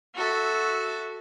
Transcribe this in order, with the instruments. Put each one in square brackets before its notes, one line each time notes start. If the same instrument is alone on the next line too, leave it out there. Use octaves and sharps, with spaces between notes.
[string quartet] F#4 A4 E5